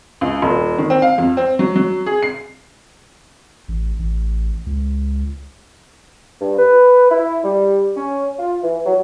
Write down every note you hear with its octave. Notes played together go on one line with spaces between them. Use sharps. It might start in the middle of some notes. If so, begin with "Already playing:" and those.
C#2
D#1
D#3
C4
F5
F2
C4
F#3
F#3
G#4
C7
A1
A1
C#2
G2
B4
E4
G3
C#4
F4
E3
F#3